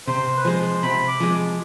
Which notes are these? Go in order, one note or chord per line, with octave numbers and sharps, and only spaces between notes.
C3 C5
B4
F3 G#3 C5
C3 B5
D6
F3 G#3